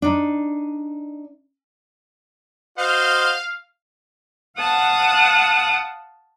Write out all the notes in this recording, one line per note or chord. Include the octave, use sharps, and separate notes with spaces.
D4 D#4
F#4 C5 D#5 F5
F5 F#5 A5 D#6 F#6